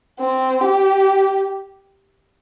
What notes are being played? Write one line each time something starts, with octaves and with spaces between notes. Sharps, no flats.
C4
G4